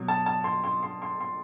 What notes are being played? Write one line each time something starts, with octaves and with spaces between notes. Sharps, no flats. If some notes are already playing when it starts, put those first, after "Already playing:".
Already playing: B2 F#3
A5
A5
C6
C6
C6
C6
C6